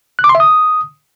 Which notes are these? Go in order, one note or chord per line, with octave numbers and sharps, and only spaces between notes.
F#6
D6
C6
E5
D#6